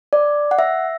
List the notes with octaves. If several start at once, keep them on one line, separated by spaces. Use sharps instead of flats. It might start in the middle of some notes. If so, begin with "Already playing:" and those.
D5
F#5
E5